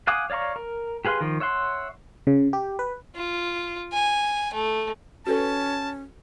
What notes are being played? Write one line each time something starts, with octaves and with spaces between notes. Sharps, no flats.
F5 F#5 G#5 D6 D#6
C#5 D5 F5 A#5 C#6
A#4
G4 G#4 B4 F5 C6
D#3 F3
C#5 E5 F#5 C6
C#3
G4
B4
F4
G#5
A3
C#4 F#4 A4 B4 A5